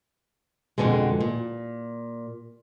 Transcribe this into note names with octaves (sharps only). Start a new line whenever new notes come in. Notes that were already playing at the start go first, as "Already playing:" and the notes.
F2 G#2 B2 D3 G#3
A#2